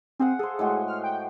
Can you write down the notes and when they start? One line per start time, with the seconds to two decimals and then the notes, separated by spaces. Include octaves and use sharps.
0.19 C4 G#4 F5 F#5
0.39 G#4 A4 C5
0.59 A2 G#3 F#4
0.87 F6
1.04 G5